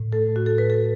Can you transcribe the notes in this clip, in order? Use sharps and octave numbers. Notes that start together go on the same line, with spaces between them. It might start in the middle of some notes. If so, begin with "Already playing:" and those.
Already playing: A2
A3 A4
A2 F#4
A4
A2 B4
A4